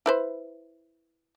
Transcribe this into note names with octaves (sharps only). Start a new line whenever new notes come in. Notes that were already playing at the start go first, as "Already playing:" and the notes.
E4 B4 C5